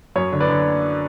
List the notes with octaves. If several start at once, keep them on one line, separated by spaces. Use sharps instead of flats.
F#2 C#5
D3
B4 D5
D3